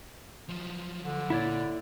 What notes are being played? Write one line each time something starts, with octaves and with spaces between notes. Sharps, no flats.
F3 F#3
D3
A#2 E4 C#5 D5